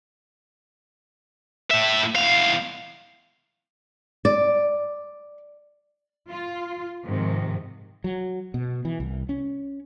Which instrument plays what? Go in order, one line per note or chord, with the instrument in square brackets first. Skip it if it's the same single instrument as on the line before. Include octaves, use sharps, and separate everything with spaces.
[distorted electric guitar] A2 E5
E2 F5
[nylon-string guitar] D5
[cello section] F4
G#2 C3 D#3 F3
[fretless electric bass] F#3
B2
E3
C2
C#4